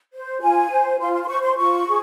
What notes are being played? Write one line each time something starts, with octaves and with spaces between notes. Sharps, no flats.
C5
F4 G#5
C5
F4 C6
C6
C6
C5 C#6
C6
F4 C#6
G#4